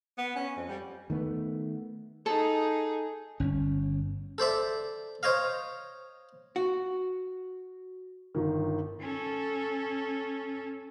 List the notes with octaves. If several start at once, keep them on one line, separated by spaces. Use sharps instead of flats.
B3
C#4
F2
G3
D#3 A3 B3
D#4 G#4 A4
G1 C#4
A4 C5 D5 E5
C5 C#5 D#5 F5
F#4
G1 D#3
C#4 A4